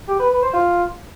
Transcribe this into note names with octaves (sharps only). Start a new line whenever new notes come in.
G4
B4
B4
C5
F4